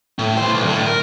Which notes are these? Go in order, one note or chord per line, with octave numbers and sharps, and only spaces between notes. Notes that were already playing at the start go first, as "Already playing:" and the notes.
A2
E3 C5
B1
D2 A2
A#4